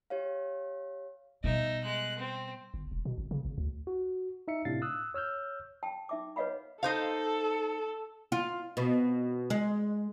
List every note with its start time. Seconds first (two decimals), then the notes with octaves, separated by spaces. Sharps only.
0.10 G4 C#5 F5
1.44 B2 G3 D#4 E5
1.84 G#3 F#6
2.18 C4
2.74 G1
2.91 E1
3.05 B2
3.18 G#1
3.31 C#3
3.45 G#1
3.58 D2
3.87 F#4
4.48 D#4 E5 C#7
4.65 A2 C3 D4 F5 A6 C7
4.82 D#6 E6 F#6
5.14 C#5 E6 F6 G6
5.83 G5 A5
6.09 D#4 E5 D6
6.36 B4 C#5 D#5 F5 F#5 B5
6.83 D#4 A4 C5 F5
8.32 F4
8.77 B2
9.50 G#3